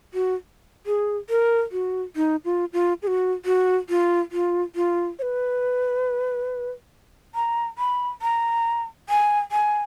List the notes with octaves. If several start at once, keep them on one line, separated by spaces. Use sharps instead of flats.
F#4
G#4
A#4
F#4
D#4
F4
F4
G#4
F#4
F#4
F4
F4
F4
C#5
B4
A#5
B5
A#5
G#5
G#5